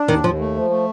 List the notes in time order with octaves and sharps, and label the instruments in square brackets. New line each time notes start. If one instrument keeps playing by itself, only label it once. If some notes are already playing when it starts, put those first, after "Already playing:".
Already playing: [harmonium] D4
[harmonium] D#2 [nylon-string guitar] D#3
[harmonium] D#2 [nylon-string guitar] F3
[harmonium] A3
F3
A3